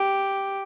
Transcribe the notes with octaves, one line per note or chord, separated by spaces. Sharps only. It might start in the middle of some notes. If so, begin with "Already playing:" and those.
Already playing: G4